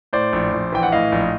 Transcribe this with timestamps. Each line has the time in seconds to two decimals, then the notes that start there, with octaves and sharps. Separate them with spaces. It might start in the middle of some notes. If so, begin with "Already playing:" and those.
0.13 A2 C5 D5
0.33 A#1
0.52 A#1
0.72 E3 G5
0.83 F#5
0.92 A2 D#5 F5
1.12 A#1